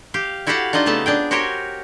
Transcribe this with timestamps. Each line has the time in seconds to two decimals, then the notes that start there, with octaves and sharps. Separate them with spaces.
0.14 G4 F5
0.47 E4 F#4 G4 A4 F5 F#5
0.73 D4 D#4 F4 D#5
0.86 C#3 A3 B3 A5
1.06 D4 G#4 G5
1.31 F#4 G4 A#4 C5 C#5 G#5